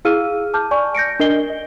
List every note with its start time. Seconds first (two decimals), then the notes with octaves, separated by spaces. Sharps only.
0.05 E4 G#4 F5 E6 F6 D#7
0.54 A5 D6 F6 G6
0.71 D5 G#5 C#6
0.95 G6 A#6 C#7 D7
1.20 D4 A#4 D#5 C7 G7
1.50 D#5